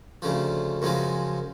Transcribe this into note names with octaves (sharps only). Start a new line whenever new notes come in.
D2 C#3 F3
F#2 C#3 F3 G#3